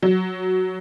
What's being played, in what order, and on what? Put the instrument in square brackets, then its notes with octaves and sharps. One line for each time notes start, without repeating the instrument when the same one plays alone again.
[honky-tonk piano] F#3